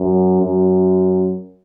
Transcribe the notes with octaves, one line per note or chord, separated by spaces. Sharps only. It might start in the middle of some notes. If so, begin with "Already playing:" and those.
Already playing: F#2
F#2